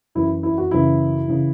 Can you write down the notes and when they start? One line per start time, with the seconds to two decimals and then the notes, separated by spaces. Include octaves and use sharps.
0.15 F#2 E3 E4
0.43 E4
0.58 F#4
0.71 F#2 C#3 E3 E4
1.28 C#3 E3